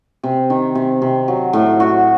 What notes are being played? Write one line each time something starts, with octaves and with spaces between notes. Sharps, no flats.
C3
D#3
C3
C3
F#3
A2
F#4